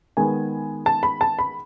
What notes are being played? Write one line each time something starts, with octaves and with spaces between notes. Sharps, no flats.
D#3 G#3 B3 G#5
A5
B5
A5
B5